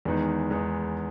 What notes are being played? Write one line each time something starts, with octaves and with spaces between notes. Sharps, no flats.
E2 D#3 G#3 B3 D#4
E2 D#3 G#3 B3 D#4